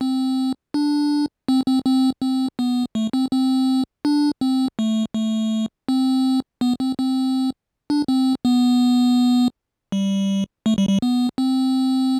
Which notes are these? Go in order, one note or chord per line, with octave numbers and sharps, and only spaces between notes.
C4
D4
C4
C4
C4
C4
B3
A3
C4
C4
D4
C4
A3
A3
C4
B3
C4
C4
D4
C4
B3
G3
A3
G3
G3
B3
C4